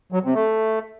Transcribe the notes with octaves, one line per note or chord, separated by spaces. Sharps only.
F#3
C3
A3